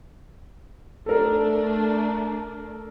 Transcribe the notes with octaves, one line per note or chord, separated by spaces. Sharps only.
A3 D4 A4 A#4